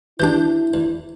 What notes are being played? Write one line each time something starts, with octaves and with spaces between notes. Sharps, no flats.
E3 D4 E4 G4 D6 G6
E2